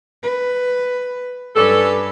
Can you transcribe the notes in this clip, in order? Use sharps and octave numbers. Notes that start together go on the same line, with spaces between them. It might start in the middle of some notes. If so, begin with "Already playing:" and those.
B4
G2 C#4 D4 A4 B4